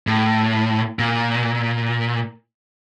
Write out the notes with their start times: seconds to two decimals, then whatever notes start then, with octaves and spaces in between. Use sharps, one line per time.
0.07 A2
0.99 A#2